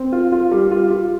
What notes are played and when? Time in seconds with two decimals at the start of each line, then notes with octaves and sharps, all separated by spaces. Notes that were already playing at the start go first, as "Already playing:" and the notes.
Already playing: C4
0.12 F4
0.32 F4
0.51 G3
0.71 F4
0.91 F4